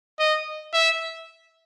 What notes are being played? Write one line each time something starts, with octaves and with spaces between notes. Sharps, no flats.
D#5
E5